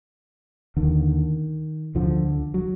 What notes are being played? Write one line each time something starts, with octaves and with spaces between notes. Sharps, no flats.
D#2 D3 D#3
D2 D3 F3
F#3